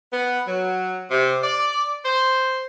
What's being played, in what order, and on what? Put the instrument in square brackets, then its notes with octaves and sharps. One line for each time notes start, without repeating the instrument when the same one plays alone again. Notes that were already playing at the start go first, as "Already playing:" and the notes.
[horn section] B3
F#3
C3
D5
C5